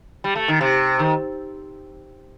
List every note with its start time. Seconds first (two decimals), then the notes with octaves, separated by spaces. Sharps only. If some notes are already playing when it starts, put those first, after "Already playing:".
0.24 G3
0.36 A3
0.48 D#3
0.61 C3
0.99 D#3